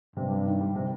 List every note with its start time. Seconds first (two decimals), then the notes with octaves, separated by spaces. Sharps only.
0.16 G2 C3
0.30 G3
0.46 D#3
0.60 G3
0.75 C3